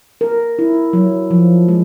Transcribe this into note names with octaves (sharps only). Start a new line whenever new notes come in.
A#4
E4
F#3
F3
G#3